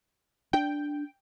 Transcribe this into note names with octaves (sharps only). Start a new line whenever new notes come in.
D4 G5